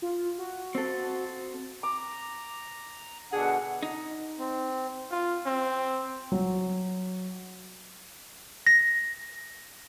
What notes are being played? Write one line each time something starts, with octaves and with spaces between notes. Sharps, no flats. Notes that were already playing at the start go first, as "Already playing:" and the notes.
F4
F#4
C4 A4
A#5 D6
B2 D3 D4 G#4 F#5
D#4
C4
F4
C4
F#3
A#6